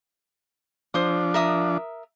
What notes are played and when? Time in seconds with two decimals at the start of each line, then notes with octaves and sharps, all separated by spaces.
0.94 F3 D4 C5 D#6
1.34 A#4 E5 D#6